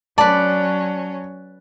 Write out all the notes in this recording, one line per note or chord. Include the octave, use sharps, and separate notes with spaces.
F#3 C#4 B4 D5 A5